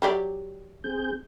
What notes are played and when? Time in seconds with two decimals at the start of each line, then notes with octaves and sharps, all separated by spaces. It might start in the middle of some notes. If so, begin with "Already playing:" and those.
0.02 F#3 G4 D5
0.84 C4 G#4 G6